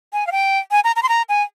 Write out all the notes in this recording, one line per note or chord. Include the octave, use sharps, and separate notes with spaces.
G#5
F5
G5
G#5
A#5
A#5
C6
A#5
G#5